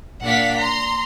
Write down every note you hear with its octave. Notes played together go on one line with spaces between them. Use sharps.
A#2 D4 F5 F#5 B6
A#5 C6